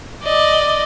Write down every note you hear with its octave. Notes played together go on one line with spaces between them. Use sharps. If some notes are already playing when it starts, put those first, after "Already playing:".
D5 D#5